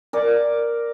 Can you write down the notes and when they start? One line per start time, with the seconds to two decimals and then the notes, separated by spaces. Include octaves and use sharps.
0.13 A#4 D5